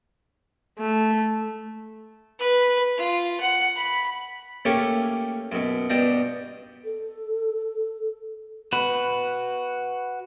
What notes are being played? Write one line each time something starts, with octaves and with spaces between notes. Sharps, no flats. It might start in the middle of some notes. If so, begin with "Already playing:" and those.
A3
B4
F4
F#5
B5
A3 A#3 C#4 G4 A4 C#5
F#2 B2
G2 B2 D5 G5 A5 A#5
A4
F#4 B4